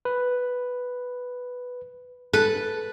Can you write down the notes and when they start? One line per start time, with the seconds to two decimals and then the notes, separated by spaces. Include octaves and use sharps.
0.05 B4
2.33 A4 B4